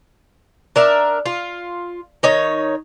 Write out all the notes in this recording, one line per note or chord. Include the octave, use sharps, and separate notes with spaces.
D4 A#4 E5
F4
D#3 D#4 C#5